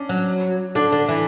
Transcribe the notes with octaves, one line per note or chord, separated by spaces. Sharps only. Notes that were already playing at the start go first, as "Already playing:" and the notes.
Already playing: C#4 D4
F#3
D3 D4
D3
E3